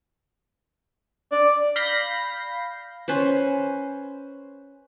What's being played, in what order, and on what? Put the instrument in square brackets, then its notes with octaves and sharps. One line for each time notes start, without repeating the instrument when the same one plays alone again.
[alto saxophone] D5
[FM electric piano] F5 B5 G6 A#6 C7
[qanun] C#4 B4 C5